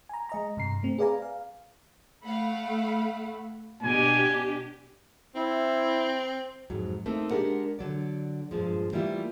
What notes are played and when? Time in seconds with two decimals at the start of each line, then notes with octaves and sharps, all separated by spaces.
0.09 G#5 A#5
0.29 G#3 D#5 A#5
0.57 G2 C3 A#5 C7
0.83 A3 C4
0.98 G#4 B4 D5 F5 G#5 A#5
1.22 F5
2.24 A3 F5 F#5 B5
3.83 B2 D4 G4 G#5
5.35 C4 E4
6.70 F2 G#2 F#3
7.06 A3 A#3 C4 D#4
7.31 G#3 D4 G4 A#4 F#5
7.79 D3 F#3 D5
8.51 G2 A#2 F3 G#3
8.93 E3 G3 A3 A#3 E4 F4